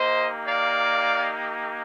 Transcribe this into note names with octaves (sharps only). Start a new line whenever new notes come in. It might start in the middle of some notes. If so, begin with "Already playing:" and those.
Already playing: A#3 D#4 G4 C5 D#5
D5 F5